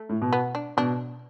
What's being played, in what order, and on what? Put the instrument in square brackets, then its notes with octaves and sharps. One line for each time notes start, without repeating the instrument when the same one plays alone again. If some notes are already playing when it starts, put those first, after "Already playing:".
Already playing: [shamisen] A3
[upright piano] A2
B2
[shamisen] B3
D4
[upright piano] B2 [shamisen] D4